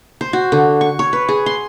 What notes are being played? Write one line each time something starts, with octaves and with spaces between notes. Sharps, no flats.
C5
F#4
D3
C#6
C#5
B4
G#4
C6